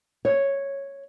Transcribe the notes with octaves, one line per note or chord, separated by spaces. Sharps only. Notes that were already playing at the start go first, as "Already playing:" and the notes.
C#5